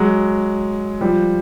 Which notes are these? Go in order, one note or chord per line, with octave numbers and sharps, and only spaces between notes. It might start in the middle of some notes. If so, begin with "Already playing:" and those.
Already playing: F#3 G#3
F3 G3